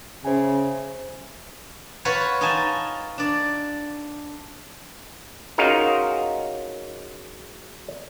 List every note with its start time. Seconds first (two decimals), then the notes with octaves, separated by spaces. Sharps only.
0.25 C#3 C5 E5 G#5
2.05 F4 F#4 B4 C#5
2.41 D#4 F4 D#5 G#5 A5
3.18 D4 D5
5.58 C#4 D#4 F4 F#4 G#4 A#4